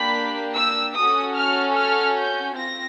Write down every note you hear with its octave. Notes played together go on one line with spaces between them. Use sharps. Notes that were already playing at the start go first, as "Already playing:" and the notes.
Already playing: A#3 D4 G4 B5
E6
C#4 F#4 A4 D#6
F6
F6
G6
C4 F4 A#6